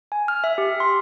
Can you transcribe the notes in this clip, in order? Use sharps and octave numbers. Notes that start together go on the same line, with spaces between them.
G#5
F6
E5
G4
C6